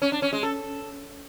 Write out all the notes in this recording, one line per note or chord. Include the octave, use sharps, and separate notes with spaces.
C#4
D4
C#4
G#3
A4